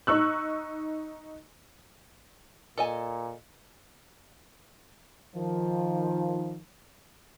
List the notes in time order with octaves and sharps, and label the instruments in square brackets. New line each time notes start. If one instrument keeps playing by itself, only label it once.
[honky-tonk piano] D#4 C#6 E6 F#6
[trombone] A#2 [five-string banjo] A4 D#5 G#5
[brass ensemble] D#3 F3